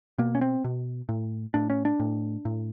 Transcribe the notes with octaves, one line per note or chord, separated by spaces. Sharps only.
B2 A#3
C#4
C4
B2
A2
A2 D4
C#4
D4
A2
A2